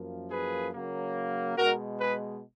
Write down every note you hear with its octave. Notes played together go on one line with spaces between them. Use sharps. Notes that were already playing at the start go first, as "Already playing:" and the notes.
Already playing: F#2 F3 A#3
G#4 B4
C#3 F#3 A#3
B2 G#3 F#4 A#4
G#4 B4